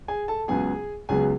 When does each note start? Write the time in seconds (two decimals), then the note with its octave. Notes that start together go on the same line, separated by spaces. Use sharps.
0.08 G#4 G#5
0.28 A4 A5
0.48 C#2 C#3 F#3 B3 G#4 G#5
1.09 C#2 C#3 F#3 B3 G#4 G#5